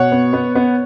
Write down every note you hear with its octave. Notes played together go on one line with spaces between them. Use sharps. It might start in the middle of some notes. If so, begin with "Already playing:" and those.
Already playing: B2 C#5 F#5
B3
B3
B3